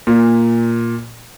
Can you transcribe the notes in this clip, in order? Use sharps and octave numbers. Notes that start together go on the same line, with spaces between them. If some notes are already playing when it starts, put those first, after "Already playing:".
A#2